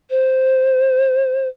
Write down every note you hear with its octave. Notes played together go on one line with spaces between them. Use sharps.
C5